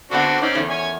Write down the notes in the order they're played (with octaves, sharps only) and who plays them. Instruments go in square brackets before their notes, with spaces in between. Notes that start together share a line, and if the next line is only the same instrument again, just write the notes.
[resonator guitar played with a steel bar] D3 B3 F#5 [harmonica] C4 D4 F#4
[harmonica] C4 C#4 D5 [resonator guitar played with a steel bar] D#4
[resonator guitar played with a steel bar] E2 D#3 A3
[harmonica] C#5 G#5